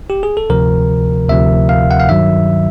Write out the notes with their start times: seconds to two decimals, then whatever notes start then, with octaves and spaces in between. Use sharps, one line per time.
0.10 G4
0.23 G#4
0.37 A4
0.50 D2 C3 F3 A#4
1.29 D2 C3 F3 E5
1.69 F5
1.91 F#5
2.00 F5
2.09 G2 D#3 F#3 E5